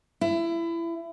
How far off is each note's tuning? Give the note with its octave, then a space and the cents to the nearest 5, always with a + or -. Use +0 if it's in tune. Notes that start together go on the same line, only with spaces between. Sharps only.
E4 +25